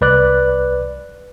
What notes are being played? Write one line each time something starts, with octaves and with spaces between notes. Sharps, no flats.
C2 B4 D5 F#6